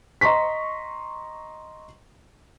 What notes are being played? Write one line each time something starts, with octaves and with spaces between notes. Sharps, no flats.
D#5 A#5 C6 C#6 B6